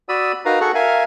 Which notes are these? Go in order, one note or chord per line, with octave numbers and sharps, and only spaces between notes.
F#4 D5 B5 D#6 E6
D#4 F#4 A#4 B4 F5 A#5
F#4 G#4 A4 F#5 C#6
A#4 E5 F5 G#5